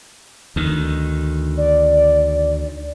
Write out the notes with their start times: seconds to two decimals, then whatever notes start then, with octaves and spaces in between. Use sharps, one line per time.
0.56 D2 D#3
1.57 D5